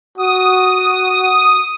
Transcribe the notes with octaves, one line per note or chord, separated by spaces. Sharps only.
F#4 D#6